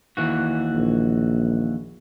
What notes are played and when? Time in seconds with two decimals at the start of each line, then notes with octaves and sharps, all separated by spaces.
0.17 D#2 E3 F#4
0.73 A#1